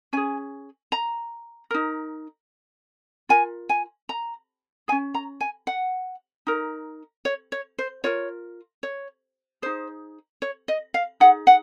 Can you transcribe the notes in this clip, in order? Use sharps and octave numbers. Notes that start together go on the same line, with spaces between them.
C#4 G#4 G#5
A#5
D#4 A#4
F4 A#4 G#5
G#5
A#5
G#4 G#5
C#4
A#5
G#5
F#5
D#4 A#4
C#5
C#5
C5
F4 A#4 C#5
C#5
D#4 G#4 C5
C#5
D#5
F5
D#4 G#4 F#5
F#5